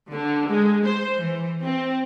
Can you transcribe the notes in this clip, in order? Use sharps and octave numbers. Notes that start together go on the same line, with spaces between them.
D3
G#3
C5
E3
C4